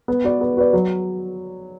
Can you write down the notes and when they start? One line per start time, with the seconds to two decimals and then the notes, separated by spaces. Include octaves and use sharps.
0.08 B3
0.24 F#4 B4 D5
0.41 B3
0.57 F#4 B4 D5
0.73 F#3